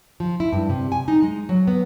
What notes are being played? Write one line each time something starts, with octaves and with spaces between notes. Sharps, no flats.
F3
E4
G2
C3
G#5
D#4
G#3
F#3
B3